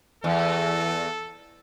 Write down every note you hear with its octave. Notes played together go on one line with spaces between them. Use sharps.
E2 A4